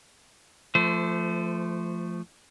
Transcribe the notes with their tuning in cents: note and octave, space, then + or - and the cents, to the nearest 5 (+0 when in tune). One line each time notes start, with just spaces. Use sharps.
F3 -10 A3 +0 C5 -35